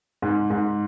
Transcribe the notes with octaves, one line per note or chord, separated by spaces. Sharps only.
G#2
G#2